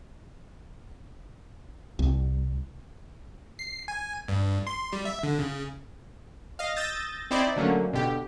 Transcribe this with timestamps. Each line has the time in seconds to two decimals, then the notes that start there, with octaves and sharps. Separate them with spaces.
1.99 C2
3.59 C7
3.88 G#5
4.28 G2
4.67 C6
4.93 G3
5.05 E5
5.23 D3
5.39 C#3
6.59 D#5 F5
6.76 D#6 E6 G6 A6 A#6
7.31 C4 D#4 E4 C5 D5
7.56 D3 F#3 A3 A#3 C#4
7.93 B2 D3 G4